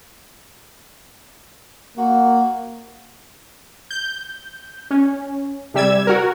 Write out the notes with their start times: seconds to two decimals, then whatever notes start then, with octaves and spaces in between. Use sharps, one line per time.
1.98 A#3 F#4
3.91 G6
4.91 C#4
5.74 C3 G3 E6 G#6
6.07 F#4 A#4